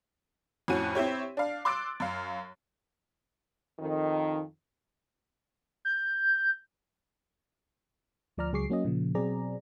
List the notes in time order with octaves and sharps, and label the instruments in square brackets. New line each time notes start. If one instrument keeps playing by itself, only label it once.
[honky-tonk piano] F2 A2 C#4 F#4 D#7
C4 E4 G4 C#5
D4 F5
C6 D6 E6 F#6 A6 D7
F#2 F5
[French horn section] F2 D#3
[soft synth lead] G6
[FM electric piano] D2 F3 D5 A#5 F6
C#2 F#3 G#4 C#6 D6 C7
F#3 A#3 C#4 F#4 D#5
A#2 C#3 F3
B2 F#3 C4 G#4 D5 A#5